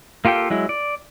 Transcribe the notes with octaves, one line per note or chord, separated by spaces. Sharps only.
A#3 F4 G4 A4 G5
F#3 G#3 E4
D5